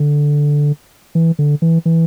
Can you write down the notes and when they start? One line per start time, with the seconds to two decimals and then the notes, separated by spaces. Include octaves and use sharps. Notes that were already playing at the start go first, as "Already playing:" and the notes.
Already playing: D3
1.15 E3
1.39 D3
1.62 E3
1.86 E3